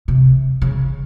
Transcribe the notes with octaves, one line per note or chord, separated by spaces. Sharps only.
C3
C#3